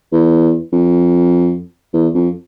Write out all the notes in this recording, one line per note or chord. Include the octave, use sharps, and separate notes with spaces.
E2
F2
E2
F2